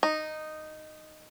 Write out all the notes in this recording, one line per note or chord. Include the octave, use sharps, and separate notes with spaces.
D#4